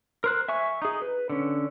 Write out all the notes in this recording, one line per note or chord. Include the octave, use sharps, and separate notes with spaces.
A#4 C5 F#6
E5 G#5 C#6
D#4 G#4
B4
D3 C#4